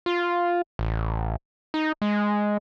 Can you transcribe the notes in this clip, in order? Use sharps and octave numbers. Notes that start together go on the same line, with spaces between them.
F4
A1
D#4
G#3